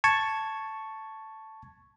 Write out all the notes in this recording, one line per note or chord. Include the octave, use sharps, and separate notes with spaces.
A5 C#6 G#6